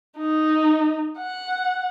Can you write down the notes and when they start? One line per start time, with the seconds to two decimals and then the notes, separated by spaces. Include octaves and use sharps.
0.18 D#4
1.19 F#5